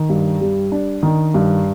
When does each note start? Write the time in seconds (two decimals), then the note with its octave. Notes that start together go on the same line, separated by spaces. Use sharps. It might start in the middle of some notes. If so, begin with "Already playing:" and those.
Already playing: D#3
0.10 G2
0.41 G3
0.72 D4
1.03 D#3
1.34 G2